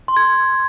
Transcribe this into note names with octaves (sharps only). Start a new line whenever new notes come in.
C6
G#6